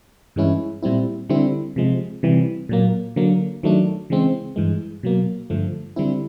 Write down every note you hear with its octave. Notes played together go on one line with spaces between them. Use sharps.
G2 E3 G#3 C#4 E4
A#2 G3 C4 E4
D3 G3 C4 E4
C3 F3 G#3
C3 E3 G3
A#2 F#3 A#3
D3 F#3 A#3
D#3 F#3 A3 D4
C#3 E3 G#3 C4
G2 E3 G#3
B2 F#3 A#3
G2 D3 F3 A3
D3 G3 C4 E4